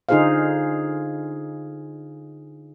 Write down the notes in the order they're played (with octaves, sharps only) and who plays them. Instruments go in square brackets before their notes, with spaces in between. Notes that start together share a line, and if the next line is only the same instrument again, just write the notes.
[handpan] D3 D#4 F4 G#4 C5 F5